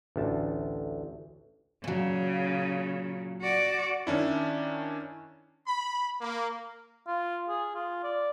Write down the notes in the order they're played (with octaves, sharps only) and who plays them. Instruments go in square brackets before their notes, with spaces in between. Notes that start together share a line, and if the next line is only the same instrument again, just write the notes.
[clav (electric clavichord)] A1 D2 A5
[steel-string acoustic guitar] A#2 F#3 [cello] C#3
[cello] F#4 D5
[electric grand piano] D#3 C#4 D4 E4
[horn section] B5
A#3
[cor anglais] F4
G#4
F4
D5